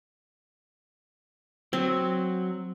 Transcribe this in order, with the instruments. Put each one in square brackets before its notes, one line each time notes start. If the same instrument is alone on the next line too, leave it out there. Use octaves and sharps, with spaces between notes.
[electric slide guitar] F#3 [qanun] C4